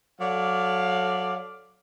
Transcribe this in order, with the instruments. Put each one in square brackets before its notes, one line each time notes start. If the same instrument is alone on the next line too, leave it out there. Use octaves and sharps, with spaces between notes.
[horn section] F#3 A4 D5 F5